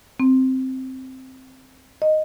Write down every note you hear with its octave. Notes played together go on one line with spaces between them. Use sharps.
C4
D#5